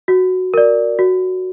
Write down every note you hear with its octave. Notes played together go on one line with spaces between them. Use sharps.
F#4
A#4 D5
F#4